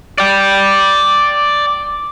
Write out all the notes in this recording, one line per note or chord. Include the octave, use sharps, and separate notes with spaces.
D5 G5